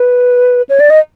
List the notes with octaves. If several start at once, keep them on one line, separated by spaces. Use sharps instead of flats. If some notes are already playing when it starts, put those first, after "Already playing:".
Already playing: B4
C#5
D5
D#5